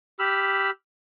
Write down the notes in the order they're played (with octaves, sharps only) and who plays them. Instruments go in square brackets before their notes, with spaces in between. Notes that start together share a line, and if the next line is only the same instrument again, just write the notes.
[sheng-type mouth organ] G4 B5 E6 F6